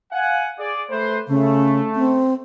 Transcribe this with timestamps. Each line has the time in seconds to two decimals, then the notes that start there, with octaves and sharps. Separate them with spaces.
0.12 F5 F#5 G#5
0.58 G#4 D5
0.90 A3 B4 C5
1.28 C#3 A3
1.96 C4